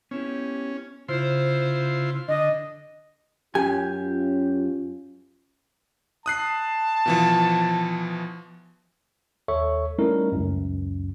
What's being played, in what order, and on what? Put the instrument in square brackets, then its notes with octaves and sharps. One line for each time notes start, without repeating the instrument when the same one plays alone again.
[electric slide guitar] B3 E4 G4 [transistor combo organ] C#4
[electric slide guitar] C#3 [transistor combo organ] E4 F4 C6 [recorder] C5
[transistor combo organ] D3 [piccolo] D#5
[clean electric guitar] F#2 [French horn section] C#4 F4 [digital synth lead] G4 [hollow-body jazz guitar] G#5
[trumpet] A5 [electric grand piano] D#6 F#6 C7
[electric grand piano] B2 E3 F3
[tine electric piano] D#2 A4 C#5 E5 C#6
G3 A3 C#4 D#4 E4 A#4
C#2 F#2